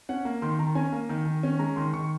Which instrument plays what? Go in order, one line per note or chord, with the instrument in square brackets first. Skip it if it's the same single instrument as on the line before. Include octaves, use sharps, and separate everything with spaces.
[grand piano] C#4 F#5
A#3
D#3 C6
D#3 A#5
C#4 G#5
A#3
D#3
D#3
C#4
G#3 A#5
D#3 C6
D#3 C#6